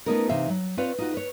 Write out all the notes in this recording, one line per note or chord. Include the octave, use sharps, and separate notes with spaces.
A3 B3 C#4 D#4 F4 A#4
C3 E3 D#4 E5 F5
F#3
C4 F4 B4 C#5 D5 F5
D#4 F4 F#4
B4 C#5